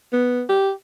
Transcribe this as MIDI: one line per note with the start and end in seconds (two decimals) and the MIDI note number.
0.13 0.43 59
0.49 0.71 67